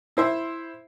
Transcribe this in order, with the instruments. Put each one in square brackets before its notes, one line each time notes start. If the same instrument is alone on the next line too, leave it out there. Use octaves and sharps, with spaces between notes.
[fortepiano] E4 C5 E5